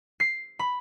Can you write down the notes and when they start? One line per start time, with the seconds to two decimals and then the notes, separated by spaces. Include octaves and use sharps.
0.20 C7
0.59 B5